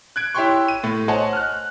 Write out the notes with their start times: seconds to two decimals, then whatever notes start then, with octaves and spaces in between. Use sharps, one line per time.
0.16 F#6 G#6 D7
0.35 E4 G4 C#5 G5 C6 C#6
0.68 D#7
0.84 A2
1.08 C5 C#5 D#5 F#5 G#5 A5
1.33 F6 F#6